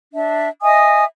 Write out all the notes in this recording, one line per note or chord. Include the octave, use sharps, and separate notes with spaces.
D4 E5
D#5 E5 G#5 D#6